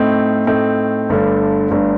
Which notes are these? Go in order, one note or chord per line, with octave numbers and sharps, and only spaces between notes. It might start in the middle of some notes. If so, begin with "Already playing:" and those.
Already playing: A2 A3 C4 D#4
A2 A3 C4 D#4
G1 G2 D3 A3 D4
G1 G2 D3 A3 D4